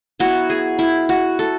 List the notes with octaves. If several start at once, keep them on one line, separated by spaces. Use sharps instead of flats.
F#3 B3 E4 F#4
G#4
E4
F#4
A4